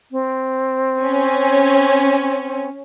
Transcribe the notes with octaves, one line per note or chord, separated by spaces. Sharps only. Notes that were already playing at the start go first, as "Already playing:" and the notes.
C4
C#4